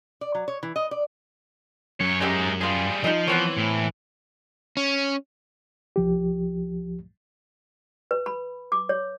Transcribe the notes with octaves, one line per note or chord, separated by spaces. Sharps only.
D5
F#3
C#5
E3
D#5
D5
F#2 C#5
G#3 C#4 D#4 G4 E5
F3 G3 F4 G#4
F3 D#4 D#5
E3 B3 C4 C#5
A2
C#4
C2 F3 G4
B4
B5
D6
C#5